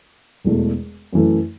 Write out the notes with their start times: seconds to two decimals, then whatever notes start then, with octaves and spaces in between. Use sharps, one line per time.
0.44 E1 E2 B2 A3
1.13 F#2 E3 A3